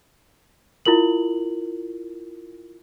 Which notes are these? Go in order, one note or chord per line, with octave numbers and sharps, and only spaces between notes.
E4 F4 A#4 F#7